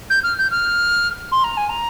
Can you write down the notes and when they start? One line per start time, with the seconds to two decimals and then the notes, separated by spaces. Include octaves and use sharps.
0.10 G6
0.23 F6
0.38 G6
0.51 F6
1.31 C6
1.44 A#5
1.57 G#5
1.69 A#5